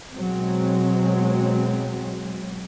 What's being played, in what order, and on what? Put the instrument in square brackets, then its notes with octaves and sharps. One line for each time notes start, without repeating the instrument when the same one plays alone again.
[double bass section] B2 F#3 G#3 C4